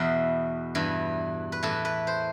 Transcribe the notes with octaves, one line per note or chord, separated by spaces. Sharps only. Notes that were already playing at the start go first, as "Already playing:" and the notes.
Already playing: E2 B2 E5
G2 E3
B4
A2 E3 A4
B4
C5